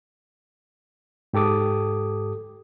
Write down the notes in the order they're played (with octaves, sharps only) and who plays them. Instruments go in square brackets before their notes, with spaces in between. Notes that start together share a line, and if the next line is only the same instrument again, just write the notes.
[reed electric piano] G#2 G4 A4 D6 D#6